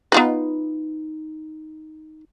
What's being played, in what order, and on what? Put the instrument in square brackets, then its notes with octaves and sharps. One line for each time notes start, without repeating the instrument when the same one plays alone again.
[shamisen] B3 F4 B4 [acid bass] D#4